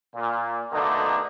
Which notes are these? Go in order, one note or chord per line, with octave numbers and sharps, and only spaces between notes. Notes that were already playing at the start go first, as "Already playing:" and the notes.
A#2
B2 D3 A3 A#3 D4 D#4